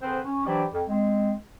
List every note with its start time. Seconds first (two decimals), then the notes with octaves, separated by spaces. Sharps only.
0.02 D3 C4 G#4 B4 C5
0.25 C#4
0.46 E3 F#3 D4 G4 C5 D5
0.73 F2
0.88 G#3 C4